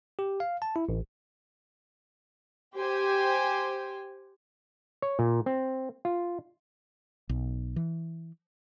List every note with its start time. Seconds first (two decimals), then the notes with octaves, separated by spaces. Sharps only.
0.19 G4
0.40 F5
0.62 A5
0.76 E4
0.89 A1
2.75 G4 C5 G5 G#5
5.02 C#5
5.19 A#2
5.46 C4
6.05 F4
7.29 B1
7.76 E3